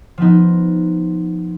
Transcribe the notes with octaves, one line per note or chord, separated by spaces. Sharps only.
F3 B3 D#4